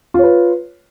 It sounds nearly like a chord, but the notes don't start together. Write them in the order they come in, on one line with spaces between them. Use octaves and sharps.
F4 C#5 B4